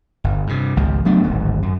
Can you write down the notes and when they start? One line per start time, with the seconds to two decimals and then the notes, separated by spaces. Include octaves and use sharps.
0.24 G1
0.47 G2 C3
0.76 G#1 C#2 F3 G#3
1.05 F#3 A3 B3 D4
1.23 D1 G#1 G#2
1.63 F#2